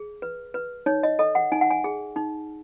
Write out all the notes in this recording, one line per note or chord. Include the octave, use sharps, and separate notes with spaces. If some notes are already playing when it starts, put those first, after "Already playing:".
Already playing: G#4
B4
B4
D#4 C#5
D#5
A4 D#5
F#5
D#4 G#5
F#5
G#5
G#4
D#4